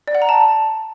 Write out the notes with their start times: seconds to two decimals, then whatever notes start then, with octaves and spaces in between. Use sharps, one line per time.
0.08 D5
0.15 F#5
0.22 A#5
0.29 A5